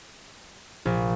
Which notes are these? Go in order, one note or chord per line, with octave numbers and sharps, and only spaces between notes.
A#1